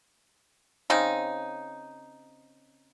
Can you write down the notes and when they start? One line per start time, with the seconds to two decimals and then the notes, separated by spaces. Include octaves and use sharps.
0.90 C#3 C4 D#4